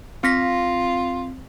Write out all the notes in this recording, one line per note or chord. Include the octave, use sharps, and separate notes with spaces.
C4 F4 A#6 B6